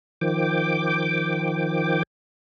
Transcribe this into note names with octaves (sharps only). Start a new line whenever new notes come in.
D#3 F3 G5 D6